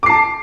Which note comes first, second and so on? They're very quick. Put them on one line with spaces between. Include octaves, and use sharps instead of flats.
D6 C7 A5